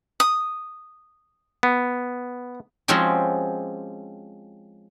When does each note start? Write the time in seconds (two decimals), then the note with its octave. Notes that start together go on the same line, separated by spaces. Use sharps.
0.20 D#6
1.63 B3
2.88 F3 G#3 C4 C#4 F#4 G4